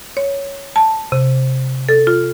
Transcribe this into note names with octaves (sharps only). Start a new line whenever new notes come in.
C#5
A5
C3
A4
F4